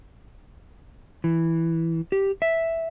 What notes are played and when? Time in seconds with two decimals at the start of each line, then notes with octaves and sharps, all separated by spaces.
1.24 E3
2.12 G4
2.42 E5